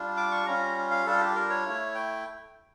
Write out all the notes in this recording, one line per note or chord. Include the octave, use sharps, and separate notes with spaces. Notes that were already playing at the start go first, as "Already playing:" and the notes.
Already playing: G3 D4 F4
D6
C#6
G3 C#4 F4 A#5
F5
G3 D4 F4 A4
G4
A#4
C#5
A3 E4
G5